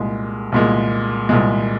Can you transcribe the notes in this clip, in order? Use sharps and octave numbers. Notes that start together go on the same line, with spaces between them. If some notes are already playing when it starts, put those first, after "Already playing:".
Already playing: C2 A#2 G#3
C2 A#2 G#3
C2 A#2 G#3